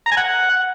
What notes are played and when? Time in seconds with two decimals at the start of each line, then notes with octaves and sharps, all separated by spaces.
0.06 A#5
0.12 G#5
0.17 F#5